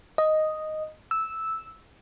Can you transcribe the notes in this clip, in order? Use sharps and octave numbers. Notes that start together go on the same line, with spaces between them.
D#5
E6